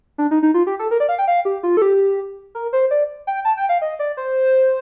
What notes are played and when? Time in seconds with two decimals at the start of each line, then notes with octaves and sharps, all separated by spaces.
0.18 D4
0.31 D#4
0.43 D#4
0.54 F4
0.67 G4
0.79 A4
0.91 A#4
1.00 D5
1.09 F5
1.18 G5
1.28 F5
1.45 G4
1.63 F4
1.77 A4
1.82 G4
2.55 A#4
2.73 C5
2.91 D5
3.27 G5
3.45 A5
3.57 G5
3.69 F5
3.82 D#5
3.99 D5
4.17 C5